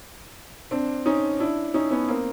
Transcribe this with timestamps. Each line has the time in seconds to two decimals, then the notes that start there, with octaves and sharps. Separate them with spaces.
0.71 C4 D4
1.06 C#4 D#4
1.40 D4 E4
1.74 C#4 D#4
1.91 B3 C#4
2.09 A#3 C4